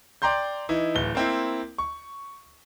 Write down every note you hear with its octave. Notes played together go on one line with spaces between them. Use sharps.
D5 G5 A#5 C6 G6
E3 D#4 E4
D1 E3 G7
A#3 C4 E4
C#6